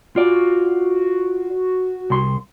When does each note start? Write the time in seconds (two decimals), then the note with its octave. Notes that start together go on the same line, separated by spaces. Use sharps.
0.16 F4 F#4 D5
2.10 C2 C6